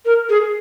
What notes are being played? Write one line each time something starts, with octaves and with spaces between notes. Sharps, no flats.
A#4
G#4